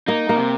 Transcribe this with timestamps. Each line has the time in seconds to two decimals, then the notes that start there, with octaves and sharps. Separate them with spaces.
0.08 A#3 D#4
0.29 A#3
0.36 C3